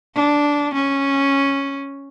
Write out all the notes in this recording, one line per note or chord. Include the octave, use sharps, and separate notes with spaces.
D4
C#4